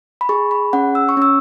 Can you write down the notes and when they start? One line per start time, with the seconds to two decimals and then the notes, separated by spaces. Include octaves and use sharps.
0.21 B5
0.29 G#4 C#6
0.51 B5
0.73 C#4 F#5
0.95 E6
1.09 C#6
1.17 C#4 E6